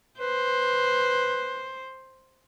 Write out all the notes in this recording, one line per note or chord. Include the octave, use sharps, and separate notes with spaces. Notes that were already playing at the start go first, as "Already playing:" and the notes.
B4 C5